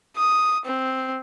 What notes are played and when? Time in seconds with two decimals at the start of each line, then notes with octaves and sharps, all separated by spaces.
0.16 D#6
0.65 C4